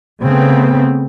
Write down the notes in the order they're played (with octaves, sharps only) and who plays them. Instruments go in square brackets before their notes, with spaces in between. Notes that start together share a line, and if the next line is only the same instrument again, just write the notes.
[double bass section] C#3 A3 B3 C4